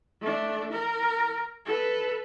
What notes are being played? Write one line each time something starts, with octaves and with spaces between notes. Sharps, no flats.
A3 D4
A#4
A4 B4